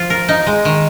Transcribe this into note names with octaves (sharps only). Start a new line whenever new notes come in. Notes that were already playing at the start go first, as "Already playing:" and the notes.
Already playing: F3 F4
A#4
D#4
G#3
D#3